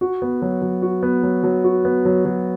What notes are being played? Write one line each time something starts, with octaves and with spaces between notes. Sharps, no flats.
F#4
B3
F#3
F#3
F#4
B3
F#3
F#3
F#4
B3
F#3
F#3